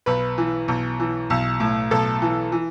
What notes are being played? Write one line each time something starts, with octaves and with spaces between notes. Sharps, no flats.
B1 B4
E3
B1
E3
B1
A2
B1 A4
E3
E3